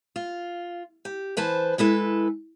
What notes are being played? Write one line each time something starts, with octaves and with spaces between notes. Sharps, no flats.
F4
G4
E3 B4 C5 A5
G#3 E4 A4 B4